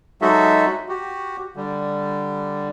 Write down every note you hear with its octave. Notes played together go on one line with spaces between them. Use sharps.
F#3 G#3 D#4 F#4 A4 E5
F#4 G4
D3 G3